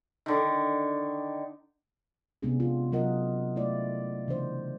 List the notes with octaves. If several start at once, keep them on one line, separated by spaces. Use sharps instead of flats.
D3 D#3
C3 G#3 B3 C#4 D4 G#4
F4
F#3 F4 A#4 D#5 F#5
A3 E4 D5
C#3 E3 D4 C5